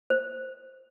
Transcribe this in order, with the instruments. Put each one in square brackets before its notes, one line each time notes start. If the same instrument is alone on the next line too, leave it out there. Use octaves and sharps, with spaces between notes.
[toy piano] C5